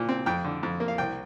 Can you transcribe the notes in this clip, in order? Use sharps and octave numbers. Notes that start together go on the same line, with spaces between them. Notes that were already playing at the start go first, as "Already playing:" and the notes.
Already playing: A#2 F3
C4
F2 G5
D3
F2
A#3
F5
C2 G5